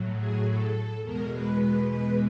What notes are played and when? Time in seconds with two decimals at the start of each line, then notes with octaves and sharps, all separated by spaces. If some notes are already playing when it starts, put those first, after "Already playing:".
Already playing: A2 F#3
0.18 G#4
0.46 A4
1.03 E2 B2 G#3 A#4
1.31 B4
1.60 B4
1.87 B4